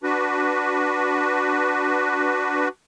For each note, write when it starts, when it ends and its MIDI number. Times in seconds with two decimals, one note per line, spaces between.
0.03 2.68 62
0.03 2.68 66
0.03 2.68 71